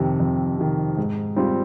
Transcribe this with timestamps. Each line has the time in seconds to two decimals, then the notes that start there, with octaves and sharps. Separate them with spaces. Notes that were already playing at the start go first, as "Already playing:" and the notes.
Already playing: F2 C3 D#3
0.20 F2
0.58 C3 D#3
0.97 G#2
1.36 G3 C4 F4